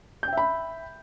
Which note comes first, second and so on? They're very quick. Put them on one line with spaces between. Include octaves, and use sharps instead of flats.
G6 G5 E5 B5